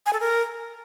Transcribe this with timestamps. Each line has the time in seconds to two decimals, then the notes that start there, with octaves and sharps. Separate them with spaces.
0.06 G#5
0.13 A4
0.20 A#4